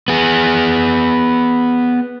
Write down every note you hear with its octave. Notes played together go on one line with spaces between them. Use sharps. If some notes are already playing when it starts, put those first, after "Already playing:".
B3 G#4